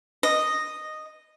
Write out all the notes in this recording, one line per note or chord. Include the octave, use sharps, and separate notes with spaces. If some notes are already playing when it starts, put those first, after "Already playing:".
D#5